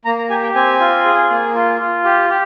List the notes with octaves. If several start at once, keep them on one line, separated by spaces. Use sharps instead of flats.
A#3 A#5
A#5
G4 G#5
G5
C4 G#5
F4
G#4
A#3
F4
F4
G4
G4